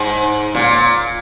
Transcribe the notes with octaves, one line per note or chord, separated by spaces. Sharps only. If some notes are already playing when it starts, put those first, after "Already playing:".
Already playing: G#2
A#2